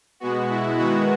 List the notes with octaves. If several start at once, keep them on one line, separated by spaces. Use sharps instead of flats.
B2 G#3 B3 F#4
E4
D#3 G#3 B3 F#4